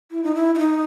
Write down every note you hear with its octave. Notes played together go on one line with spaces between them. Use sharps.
E4
D#4
E4
E4
D#4